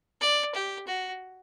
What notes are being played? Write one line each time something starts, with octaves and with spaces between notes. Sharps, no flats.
D5
G4
F#4